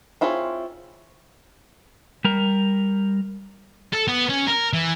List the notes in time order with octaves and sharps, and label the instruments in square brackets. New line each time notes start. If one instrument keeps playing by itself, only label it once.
[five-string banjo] C4 E4 F4 G#4 C#5
[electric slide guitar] G3 A#4
[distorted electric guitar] A4
B3
C#4
A#4
E3